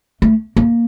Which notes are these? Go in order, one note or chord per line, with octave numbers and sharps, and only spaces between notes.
A3
A#3